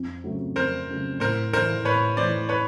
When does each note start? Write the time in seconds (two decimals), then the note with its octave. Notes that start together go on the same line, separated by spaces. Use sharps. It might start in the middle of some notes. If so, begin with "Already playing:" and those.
Already playing: F2
0.24 C#3 F#3 A3
0.56 F2 A#4 C5
0.89 C#3 F#3 A3
1.20 A2 A#4 C5
1.53 E3 A3 A#4 C5
1.85 A2 B4 C#5
2.17 E3 A3 C5 D5
2.49 B4 C#5